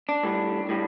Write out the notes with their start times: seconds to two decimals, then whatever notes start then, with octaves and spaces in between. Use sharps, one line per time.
0.09 D4
0.23 A2 G3
0.69 A2 G3